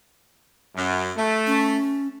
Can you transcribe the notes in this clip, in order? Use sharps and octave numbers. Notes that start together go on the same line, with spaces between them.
F#2
A3
C#4